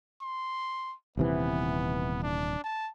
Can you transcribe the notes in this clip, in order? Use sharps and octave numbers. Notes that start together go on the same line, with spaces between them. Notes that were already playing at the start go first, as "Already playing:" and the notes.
C6
D#1 C3 E3 B3
D4
A5